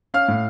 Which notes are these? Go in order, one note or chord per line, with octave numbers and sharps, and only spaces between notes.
C#4 F5 F6
A2